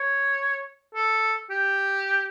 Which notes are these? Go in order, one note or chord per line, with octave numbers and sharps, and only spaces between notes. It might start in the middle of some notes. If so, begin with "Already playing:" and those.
Already playing: C#5
A4
G4